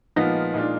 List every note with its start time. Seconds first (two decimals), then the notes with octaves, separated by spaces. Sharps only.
0.16 A#2 F3 G#3 B3 D#4 F4 D#5
0.54 A#2 G#3 D4 F4